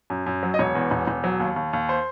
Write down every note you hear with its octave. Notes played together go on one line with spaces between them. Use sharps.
F#2
F#2
F#3
D#5
E1 C#5
E2
E1
E1
F#3
D#2
D#2
D#2
C5